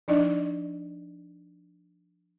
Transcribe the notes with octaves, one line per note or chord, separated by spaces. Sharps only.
F3 D4 D#4 D5 D#5